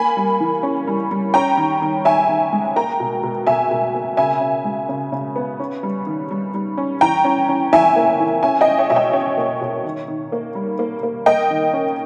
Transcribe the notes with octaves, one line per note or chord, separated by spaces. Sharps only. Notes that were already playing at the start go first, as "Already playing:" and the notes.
Already playing: A#3 G#5 B5
G3
E3
C#4
G3
G3
C#4 G5 A#5
D#3
D#3
D#3 E5 G#5
D#3
G#3
A#3 G5 A#5
B2
B2
B2 E5 G#5
B2
A#3
C#3 E5 G#5
C#3
G#3
C#3
C#3
B3
C#4
G3
D#3
G3
G3
C#4
E3 G5 A#5
C#4
C#4
E3 E5 G#5
A#3
E3
C#4 E5 G#5
D#5 G5
C#4
C#5 E5
B2 E5
D#5 G5
C#4 C#5 E5
A#3
B2
D#3
D#3
A#3
G3
A#3
A#3
A#3 D#5 G5
D#3
C#4